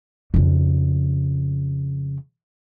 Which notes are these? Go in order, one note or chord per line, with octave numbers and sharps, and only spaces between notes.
F2 C#3